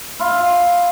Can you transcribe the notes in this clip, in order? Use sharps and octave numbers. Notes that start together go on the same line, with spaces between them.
E4 F4